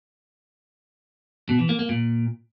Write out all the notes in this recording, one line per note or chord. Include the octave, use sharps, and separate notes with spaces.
B2
E3
A#3
A#3
A#2